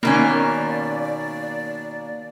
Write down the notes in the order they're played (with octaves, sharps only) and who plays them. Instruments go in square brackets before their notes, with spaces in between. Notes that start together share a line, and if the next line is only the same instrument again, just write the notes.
[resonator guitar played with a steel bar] B2 D#3 C#4 [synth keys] A#3 [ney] D5